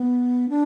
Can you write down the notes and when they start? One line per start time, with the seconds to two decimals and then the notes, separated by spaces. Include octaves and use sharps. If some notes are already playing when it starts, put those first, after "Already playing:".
Already playing: B3
0.49 D4